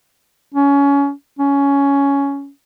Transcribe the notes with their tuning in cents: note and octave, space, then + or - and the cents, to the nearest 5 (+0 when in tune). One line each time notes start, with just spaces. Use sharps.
C#4 +25
C#4 +10